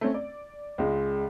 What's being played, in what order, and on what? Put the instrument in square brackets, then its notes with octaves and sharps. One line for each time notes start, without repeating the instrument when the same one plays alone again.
[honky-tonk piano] A3 C4 C#4
D5
[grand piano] C#2 G#3